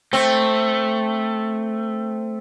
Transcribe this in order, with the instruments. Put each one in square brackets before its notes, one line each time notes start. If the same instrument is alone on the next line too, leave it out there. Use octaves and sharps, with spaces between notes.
[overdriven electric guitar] A3 [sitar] C4